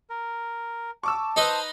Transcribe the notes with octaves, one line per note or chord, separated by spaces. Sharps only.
A#4
A5 C#6 D6 E6
D#4 B4 C5 D#5